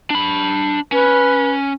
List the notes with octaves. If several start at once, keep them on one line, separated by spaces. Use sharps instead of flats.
D4 B5
C#4 B4